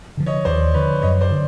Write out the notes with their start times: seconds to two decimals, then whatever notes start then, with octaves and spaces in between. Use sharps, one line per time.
0.17 D3 F3
0.26 C#5 D#5
0.45 D#2 C5 D5
0.74 D3 F3 B4 C#5
1.02 F#2 C#5 D#5
1.21 C5 D5
1.30 D3